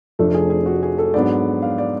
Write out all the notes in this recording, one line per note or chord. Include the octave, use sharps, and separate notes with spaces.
F1 F2 F3 A3 D4 A4
G#4
G#4
F#4
G#4
A4
G#2 F#3 B3 D4 D5
F5
D5